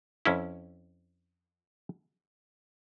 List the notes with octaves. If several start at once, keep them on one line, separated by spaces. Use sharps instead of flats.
F2 C#4 E4